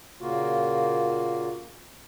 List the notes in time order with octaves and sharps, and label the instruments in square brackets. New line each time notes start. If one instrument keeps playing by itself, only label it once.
[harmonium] A#2 C#3 A#3 F4 F#4